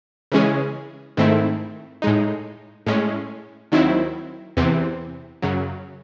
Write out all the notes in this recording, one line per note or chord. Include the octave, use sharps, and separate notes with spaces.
C#3 E3 G#3 C#4 G#4
G#2 D#3 A3 C4 E4
A2 G#3 D#4
A2 G#3 C#4
D#2 D#3 F#3 C4 E4
E2 C3 E3 C4
F#2 C#3 F#3